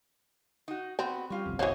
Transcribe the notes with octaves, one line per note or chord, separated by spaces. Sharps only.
D#4 F#4
B3 C4 F#4
G3 C#4 F4 G4
G1 C2 F2
E3 A#3 F#4 C5 C#5 D#5